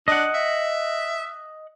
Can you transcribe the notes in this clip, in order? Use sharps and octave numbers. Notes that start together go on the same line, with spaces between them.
D4 D#5 F#5
E5